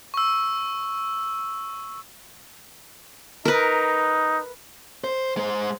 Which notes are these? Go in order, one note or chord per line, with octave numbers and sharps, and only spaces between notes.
C#6 E6
D#4 A#4 B4
C5
G#3 C5